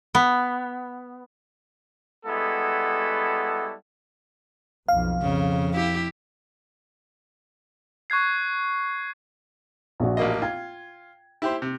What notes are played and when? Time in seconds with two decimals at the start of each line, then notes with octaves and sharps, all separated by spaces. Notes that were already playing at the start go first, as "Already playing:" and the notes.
0.15 B3
2.26 G3 G#3 B3 E4 F#4 A4
4.88 B1 F2 F5
5.22 F2 C#3
5.75 E4 G4
8.10 C#6 F#6 G#6 C7
10.00 A#1 A#2 F#4
10.17 A1 A#3 D#5
10.42 F4 G5 G#6
11.42 E4 G4 C5
11.62 C3